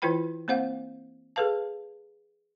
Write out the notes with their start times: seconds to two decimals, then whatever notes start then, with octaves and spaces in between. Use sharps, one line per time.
0.02 E3 E4 F4 B4 G5 B5
0.48 A#3 C4 C5 F5 F#5
1.36 G#4 A4 B4 F5 A5